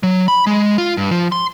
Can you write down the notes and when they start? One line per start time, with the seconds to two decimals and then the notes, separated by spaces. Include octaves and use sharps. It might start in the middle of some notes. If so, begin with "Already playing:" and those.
0.03 F#3
0.28 B5
0.47 G#3
0.78 F4
0.97 G2
1.11 F3
1.32 C6